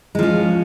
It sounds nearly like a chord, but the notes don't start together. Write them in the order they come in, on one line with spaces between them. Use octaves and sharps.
G#3 F3 C#4